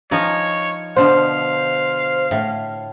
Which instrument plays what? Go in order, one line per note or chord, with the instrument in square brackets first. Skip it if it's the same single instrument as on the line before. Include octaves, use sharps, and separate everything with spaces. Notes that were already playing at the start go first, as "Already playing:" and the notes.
[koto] F3 D#4 G#5 [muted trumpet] C#5
[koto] B2 D3 F3 [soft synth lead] C5 [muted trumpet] F5
[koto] A2